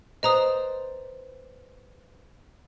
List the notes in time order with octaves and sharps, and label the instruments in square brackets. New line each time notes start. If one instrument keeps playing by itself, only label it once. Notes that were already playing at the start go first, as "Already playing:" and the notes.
[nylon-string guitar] B4 C5 D5 [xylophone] D#5 A#5 D#6